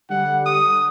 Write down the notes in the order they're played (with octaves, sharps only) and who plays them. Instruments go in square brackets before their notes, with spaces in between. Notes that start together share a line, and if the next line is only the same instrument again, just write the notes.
[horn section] D3 G3 [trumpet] F#5
[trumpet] D#6